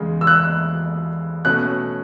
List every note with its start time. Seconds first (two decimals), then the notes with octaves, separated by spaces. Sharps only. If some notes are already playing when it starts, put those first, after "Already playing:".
Already playing: E2 C#3 G#3
0.21 E6
0.27 F#6
1.45 B2 A3 C#4 F#6